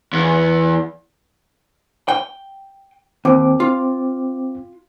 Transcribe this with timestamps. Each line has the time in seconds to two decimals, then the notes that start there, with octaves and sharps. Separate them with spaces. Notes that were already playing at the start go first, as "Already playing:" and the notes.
0.13 E2
2.08 G5
3.25 D#2 C4 G5 D6
3.60 F4